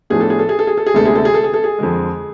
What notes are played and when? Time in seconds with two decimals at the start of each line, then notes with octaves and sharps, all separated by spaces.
0.10 A2 F3 B3 D4 G#4
0.21 A4
0.30 G#4
0.39 A4
0.49 G#4
0.59 A4
0.67 G#4
0.77 A4
0.86 G#4
0.94 D2 C3 G#3 B3 D4 A4
1.05 G#4
1.15 A4
1.25 G#4
1.34 A4
1.44 G#4
1.54 A4
1.64 G#4
1.79 F2 D3 G#3